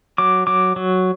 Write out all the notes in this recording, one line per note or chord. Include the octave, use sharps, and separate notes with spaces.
F#3 D6
F#3 D6
F#3